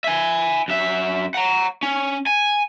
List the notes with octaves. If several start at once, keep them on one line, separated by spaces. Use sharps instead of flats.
E5 G#5
F#2 E5
F#5 A#5
C#4
G#5